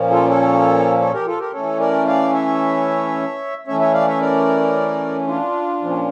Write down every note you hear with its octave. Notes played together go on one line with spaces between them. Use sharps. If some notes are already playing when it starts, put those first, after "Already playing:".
Already playing: A#2 F3 A#3 C#4
F4 A4
A4 C#5
A4 C#5
G4 A#4
F4 A4
G4 A#4
E3 A3 C#4 A4 C#5
A#4 D5
D5 F5
C#5 E5
E3 A3 C#4 C#5 E5
C#5 E5
D5 F5
C#5 E5
A#4 D5
D4 F4
A#2 F3 C#4